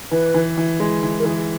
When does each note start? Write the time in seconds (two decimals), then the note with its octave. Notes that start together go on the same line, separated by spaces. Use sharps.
0.11 E3 B4
0.34 E3
0.58 E3
0.80 G#3
1.03 E3
1.19 A#4
1.25 E3 G#4